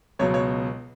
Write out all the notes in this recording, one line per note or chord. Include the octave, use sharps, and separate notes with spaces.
C#2 B2 F#3 C#5
C#5